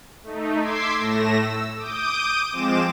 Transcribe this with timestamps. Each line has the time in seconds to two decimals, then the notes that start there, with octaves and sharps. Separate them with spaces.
0.23 A3 D#4
0.60 C6 D6 E6 G#6 B6 C7
0.96 A2 A3 A#6 E7
1.40 E6
1.77 D6 D#6 G6 D7 D#7
2.50 F3 G#3 C4 D6 E7